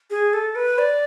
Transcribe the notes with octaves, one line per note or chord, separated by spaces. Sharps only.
G#4
A4
B4
D5